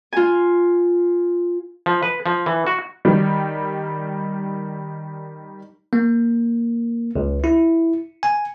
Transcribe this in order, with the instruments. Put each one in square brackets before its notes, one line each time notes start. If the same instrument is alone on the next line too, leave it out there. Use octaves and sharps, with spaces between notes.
[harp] F4 G#5
[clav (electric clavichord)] F3
B4
F3
E3
F#4
[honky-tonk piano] D#3 G3
[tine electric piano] A#3
C#2
E4
G#5